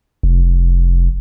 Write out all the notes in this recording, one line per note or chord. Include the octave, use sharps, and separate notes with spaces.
F1